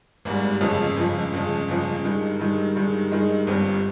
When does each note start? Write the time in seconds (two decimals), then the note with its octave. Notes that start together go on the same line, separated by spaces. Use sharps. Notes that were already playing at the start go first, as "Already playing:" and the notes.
0.25 G#1 G#2 G3
0.61 G1 F2 C#3 F3 G#3
0.96 G1 F2 C#3 F3 G#3
1.32 G1 F2 C#3 F3 G#3
1.68 G1 F2 C#3 F3 G#3
2.04 G2 D#3 G#3
2.39 G2 D#3 G#3
2.75 G2 D#3 G#3
3.12 G2 D#3 G#3
3.47 G1 G2 G3 C4 G4